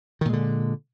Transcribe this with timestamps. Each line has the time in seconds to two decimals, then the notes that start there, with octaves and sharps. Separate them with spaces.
0.21 D#3
0.25 A#2
0.29 G#3
0.33 D3